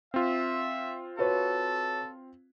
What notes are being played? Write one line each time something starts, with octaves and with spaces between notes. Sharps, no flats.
C4 F4 E5
F#4 A4 B4 C#5